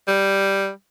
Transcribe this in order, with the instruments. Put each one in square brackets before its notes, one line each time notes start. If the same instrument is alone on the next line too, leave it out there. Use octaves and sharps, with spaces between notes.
[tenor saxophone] G3